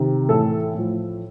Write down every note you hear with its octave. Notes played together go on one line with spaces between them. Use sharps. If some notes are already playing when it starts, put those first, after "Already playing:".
Already playing: C3 D#3
A2 E3 A4
A2 F3